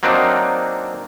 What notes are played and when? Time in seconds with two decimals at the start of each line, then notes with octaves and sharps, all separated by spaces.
0.03 F#3 A#3 C4 D4 D#4